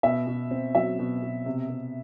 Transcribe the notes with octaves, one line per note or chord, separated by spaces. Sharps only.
B2 E5
B2
C4
F#3 E5
B2
B2
C3
C3